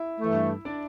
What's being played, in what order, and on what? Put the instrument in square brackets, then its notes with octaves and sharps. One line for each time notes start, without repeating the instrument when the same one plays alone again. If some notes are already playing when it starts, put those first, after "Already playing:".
Already playing: [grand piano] E4 E5
[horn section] G2 E3 A3
[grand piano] D4 D5